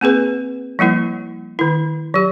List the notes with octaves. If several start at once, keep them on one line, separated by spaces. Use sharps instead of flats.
A#3 C4 G#4 B4
F3 G3 A#3 E4
D#3 E4
F#3 G4